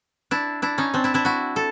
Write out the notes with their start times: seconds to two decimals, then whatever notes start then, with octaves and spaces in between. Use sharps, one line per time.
0.31 D4 E4
0.62 D4 E4
0.78 C#4 D#4
0.94 C4 D4
1.04 D4 E4
1.14 D4 E4
1.25 E4 F#4
1.56 A4